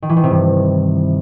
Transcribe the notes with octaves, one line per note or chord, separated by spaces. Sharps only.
D#3
E3
D#3
C3
G2